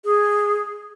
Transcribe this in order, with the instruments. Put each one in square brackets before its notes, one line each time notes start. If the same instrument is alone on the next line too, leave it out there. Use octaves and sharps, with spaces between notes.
[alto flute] G#4